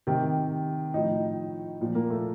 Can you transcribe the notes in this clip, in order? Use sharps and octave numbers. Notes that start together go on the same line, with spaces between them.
C3 D#3 G4
A2 F3 D#4
A#2 F3
A#3
A3